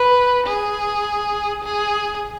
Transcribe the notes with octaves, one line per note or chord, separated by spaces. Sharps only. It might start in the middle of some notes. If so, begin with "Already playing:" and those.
Already playing: B4
G#4
G#4